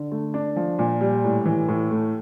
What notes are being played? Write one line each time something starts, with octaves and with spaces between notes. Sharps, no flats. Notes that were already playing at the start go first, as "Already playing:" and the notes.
Already playing: D3
A3
D4
F3
A#2
G3
A2
E3
A2
A3